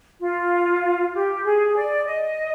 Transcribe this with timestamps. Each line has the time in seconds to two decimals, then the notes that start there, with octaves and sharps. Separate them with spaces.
0.22 F4
1.15 G4
1.45 G#4
1.77 D5
2.07 D#5